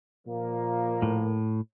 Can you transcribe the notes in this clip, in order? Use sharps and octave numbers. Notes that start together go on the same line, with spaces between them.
A#2 F3 A#3
A2